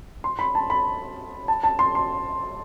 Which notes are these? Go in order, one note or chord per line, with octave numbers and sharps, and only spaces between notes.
C6
B5
A5
B5
A5
A5
C6
C6